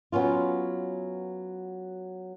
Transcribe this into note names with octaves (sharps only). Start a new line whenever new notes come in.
F#3 B3 C#4 F4